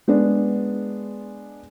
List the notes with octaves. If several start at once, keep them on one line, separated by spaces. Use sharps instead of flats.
G#3 B3 D4